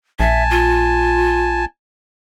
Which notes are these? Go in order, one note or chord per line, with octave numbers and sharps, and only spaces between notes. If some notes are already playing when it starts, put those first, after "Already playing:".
A#1 E5 G#5 A5
F4